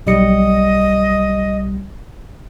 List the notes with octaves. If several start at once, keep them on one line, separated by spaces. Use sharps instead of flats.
B1 G3 D#5 C#7